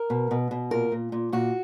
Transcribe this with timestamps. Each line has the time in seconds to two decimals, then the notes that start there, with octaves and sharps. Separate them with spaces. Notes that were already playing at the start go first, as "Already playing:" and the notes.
Already playing: A#4
0.10 B2
0.31 B2
0.51 B2
0.71 A#2 A#4
0.92 A#2
1.12 A#2
1.33 A#2 F#4